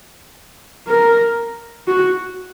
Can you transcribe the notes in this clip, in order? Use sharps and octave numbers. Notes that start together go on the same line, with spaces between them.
A#4
F#4